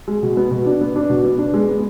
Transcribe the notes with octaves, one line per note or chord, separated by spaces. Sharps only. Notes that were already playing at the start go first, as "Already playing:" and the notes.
G#3
B2
B3
B2
D4
B3
D4
B2
B3
D4
G#3
B3